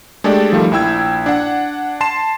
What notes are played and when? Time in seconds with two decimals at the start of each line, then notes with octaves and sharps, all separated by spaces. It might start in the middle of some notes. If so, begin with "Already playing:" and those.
0.24 G#3 A3 D4 G4 A4 D5
0.52 D#3 F3 G3 A3
0.71 A#1 E4 G5 E6 G#6
1.26 D4 F#5
2.01 A5 C6 C7 E7